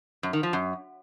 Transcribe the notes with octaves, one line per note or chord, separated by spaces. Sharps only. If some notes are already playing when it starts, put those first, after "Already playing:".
F#2
D#3
F3
F#2